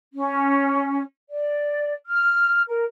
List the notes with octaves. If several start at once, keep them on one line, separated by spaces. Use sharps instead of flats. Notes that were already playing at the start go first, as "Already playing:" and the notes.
C#4
D5
F6
A#4